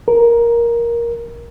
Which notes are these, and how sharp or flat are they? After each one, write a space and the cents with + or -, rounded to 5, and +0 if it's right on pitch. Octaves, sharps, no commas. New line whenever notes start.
A#4 +10